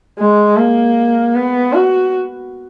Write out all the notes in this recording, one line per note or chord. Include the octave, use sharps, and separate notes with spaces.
G#3
A#3
B3
F#4